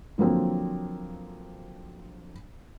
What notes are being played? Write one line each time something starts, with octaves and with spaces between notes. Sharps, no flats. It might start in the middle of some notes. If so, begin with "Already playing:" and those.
D3 F3 F#3 A#3 C4